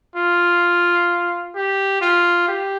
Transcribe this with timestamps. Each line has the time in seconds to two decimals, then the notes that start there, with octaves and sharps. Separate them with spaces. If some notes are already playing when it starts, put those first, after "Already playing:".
0.16 F4
1.55 G4
2.01 F4
2.48 G4